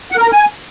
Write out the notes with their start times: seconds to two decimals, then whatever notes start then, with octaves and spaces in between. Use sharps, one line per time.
0.12 F#5
0.17 A#4
0.22 A#5
0.27 A#4
0.32 G#5